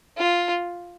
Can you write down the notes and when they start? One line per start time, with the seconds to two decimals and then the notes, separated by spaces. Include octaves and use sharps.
0.17 F4